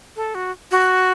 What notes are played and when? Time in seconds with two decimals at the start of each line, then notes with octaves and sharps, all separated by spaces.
0.16 A4
0.35 F#4
0.71 F#4